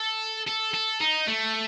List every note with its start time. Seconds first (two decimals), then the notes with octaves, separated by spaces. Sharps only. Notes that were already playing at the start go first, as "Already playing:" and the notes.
Already playing: A4
0.47 A4
0.74 A4
1.00 D#4
1.27 A3